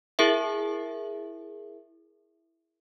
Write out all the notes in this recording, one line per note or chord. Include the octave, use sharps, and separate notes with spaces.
E4 G#4 A#4 E5